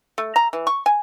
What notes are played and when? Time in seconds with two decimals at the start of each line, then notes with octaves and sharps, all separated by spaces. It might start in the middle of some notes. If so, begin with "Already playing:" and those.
0.18 A3
0.36 A#5
0.53 E3
0.67 C#6
0.86 G#5